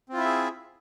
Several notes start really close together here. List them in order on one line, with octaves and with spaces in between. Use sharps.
C4 F4 E4 E5 G#4